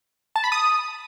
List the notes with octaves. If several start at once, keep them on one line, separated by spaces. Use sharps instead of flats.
A5
B5
D#6